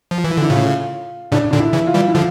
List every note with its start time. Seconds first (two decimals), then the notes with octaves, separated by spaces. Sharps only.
0.11 F3
0.24 E3
0.37 D3 E4
0.50 A2 C#3 F4
1.32 A2 C#3 D4
1.51 A#2 D3 D4
1.60 E4
1.73 C#3 E3
1.87 F4
1.94 E3 G3
2.08 E4
2.14 D3 F3 F4